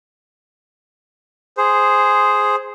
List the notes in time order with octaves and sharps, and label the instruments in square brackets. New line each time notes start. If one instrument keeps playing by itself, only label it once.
[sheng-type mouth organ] G#4 C5